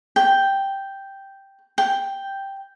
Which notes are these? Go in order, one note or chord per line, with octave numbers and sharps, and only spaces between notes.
G5
G5